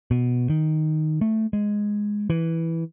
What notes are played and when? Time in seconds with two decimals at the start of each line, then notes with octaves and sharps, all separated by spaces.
0.11 B2
0.50 D#3
1.21 A3
1.53 G#3
2.30 E3